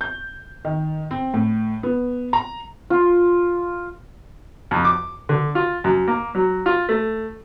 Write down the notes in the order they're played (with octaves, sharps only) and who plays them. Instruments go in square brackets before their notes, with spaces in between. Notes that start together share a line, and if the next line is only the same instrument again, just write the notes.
[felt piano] G6
D#3
C4
A2
B3
A#5
[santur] F4
[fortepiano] F2
D6
D3
F4
F#2
A#3
F#3
F4
A3